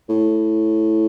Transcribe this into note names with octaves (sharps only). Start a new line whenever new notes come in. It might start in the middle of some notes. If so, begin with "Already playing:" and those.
A2